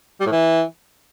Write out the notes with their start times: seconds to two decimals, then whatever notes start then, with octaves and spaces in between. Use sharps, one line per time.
0.20 G3
0.26 A2
0.32 E3